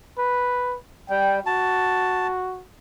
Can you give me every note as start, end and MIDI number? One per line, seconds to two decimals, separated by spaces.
0.18 0.76 71
1.10 1.40 55
1.10 1.40 79
1.46 2.64 66
1.46 2.27 81